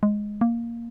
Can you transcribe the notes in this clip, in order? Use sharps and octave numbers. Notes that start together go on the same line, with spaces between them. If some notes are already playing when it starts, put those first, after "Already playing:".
G#3
A#3